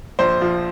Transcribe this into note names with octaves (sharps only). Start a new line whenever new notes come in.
A#1 C5
F3